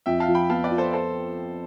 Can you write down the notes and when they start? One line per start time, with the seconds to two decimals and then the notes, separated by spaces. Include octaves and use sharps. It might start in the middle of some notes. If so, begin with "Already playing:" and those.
0.06 F2 E5 G5
0.20 F5 A5
0.28 F3
0.35 G5 B5
0.50 B3 F5 A5
0.64 B4 D5
0.71 F3
0.78 A4 C5
0.93 A4 C5